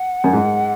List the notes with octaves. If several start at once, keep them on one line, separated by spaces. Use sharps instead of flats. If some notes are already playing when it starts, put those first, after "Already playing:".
Already playing: F#5
F#2
G#2